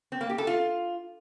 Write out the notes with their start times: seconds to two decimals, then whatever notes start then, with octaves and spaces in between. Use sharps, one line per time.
0.12 C4
0.21 A#3
0.30 G4
0.38 A4
0.47 F4